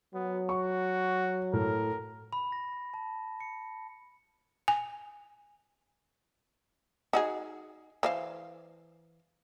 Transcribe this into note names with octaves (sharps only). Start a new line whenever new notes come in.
F#3 B3
F#4 C#6
A2 A#4
B5
A#6
A5
C#7
G#5
D#4 F#4 G#4
E3 C5 F5